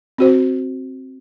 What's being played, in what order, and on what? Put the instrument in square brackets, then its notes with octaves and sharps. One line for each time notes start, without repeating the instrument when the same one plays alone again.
[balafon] C4 F#4 C5